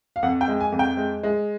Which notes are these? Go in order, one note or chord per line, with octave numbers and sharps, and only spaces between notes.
F5
F2 F#5
G5
G#3
G#5
F2
G5
G#3
G#3